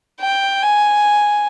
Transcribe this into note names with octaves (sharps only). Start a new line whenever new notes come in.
G5
G#5